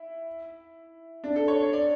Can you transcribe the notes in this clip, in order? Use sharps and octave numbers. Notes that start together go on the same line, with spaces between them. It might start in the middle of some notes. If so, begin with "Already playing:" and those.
Already playing: E4
D4
A4
C#5
D5